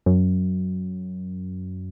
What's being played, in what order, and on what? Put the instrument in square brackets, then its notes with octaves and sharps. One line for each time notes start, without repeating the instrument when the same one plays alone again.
[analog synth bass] F#2